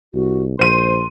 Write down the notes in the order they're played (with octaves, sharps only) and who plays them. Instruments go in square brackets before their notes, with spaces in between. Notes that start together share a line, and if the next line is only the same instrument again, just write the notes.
[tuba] C2 [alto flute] F#4
[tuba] A#1 [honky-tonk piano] C5 D#7 [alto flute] C6